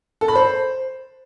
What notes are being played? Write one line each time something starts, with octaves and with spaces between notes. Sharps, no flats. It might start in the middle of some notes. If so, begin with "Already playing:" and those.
A4
B5
C5